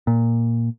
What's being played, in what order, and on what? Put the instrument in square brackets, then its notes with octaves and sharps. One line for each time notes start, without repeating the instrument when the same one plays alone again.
[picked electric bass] A#2